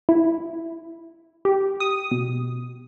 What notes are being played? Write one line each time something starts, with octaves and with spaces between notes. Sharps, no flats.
E4
G4
D#6
B2